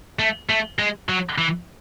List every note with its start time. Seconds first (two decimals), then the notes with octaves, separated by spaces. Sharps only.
0.19 A3
0.49 A3
0.79 G#3
1.09 F#3
1.38 E3